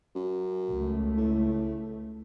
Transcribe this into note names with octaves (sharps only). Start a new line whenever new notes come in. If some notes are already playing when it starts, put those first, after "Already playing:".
F#2
C#2 A3
A2